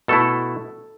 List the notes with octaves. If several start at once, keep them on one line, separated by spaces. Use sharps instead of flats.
B2 A3 E4 A4